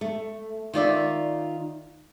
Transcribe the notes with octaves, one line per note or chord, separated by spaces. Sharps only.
A3
D#3 F4 D5 E5